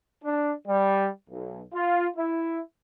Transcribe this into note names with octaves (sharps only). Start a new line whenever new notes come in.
D4
G3
B1
F4
E4